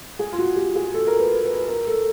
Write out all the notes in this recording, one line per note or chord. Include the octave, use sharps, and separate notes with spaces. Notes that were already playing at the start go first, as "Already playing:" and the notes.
G#4
F4
F#4
G4
G#4
A4
A#4
B4
B4
A#4
A4